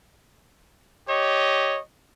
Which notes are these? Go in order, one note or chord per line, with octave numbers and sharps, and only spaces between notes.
G4 C#5 D#5